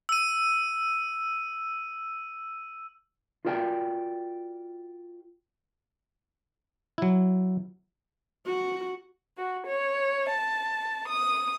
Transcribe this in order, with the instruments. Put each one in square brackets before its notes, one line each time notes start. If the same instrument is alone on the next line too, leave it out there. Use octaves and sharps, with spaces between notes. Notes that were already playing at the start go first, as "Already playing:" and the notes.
[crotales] E6 D#7
[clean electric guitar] F4 F#4 A#4 D5 G5
[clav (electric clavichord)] F#3 E4
[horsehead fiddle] F#4
[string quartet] F#4
C#5
A5
D#6